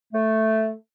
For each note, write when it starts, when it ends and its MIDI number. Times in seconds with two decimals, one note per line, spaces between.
0.13 0.73 57